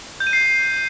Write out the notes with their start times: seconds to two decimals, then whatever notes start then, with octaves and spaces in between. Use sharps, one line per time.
0.20 G6
0.27 D#7
0.33 C7